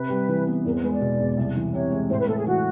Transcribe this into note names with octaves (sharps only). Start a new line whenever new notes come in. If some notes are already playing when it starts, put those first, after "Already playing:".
Already playing: C3 B4
G3
E3
B3
E2 A#4
C5
G#3 B4
D5
B2
E2
C2
E3
C3 C#5
G#3
A2 C5
B4
A3 A4
G#4
E3 F#4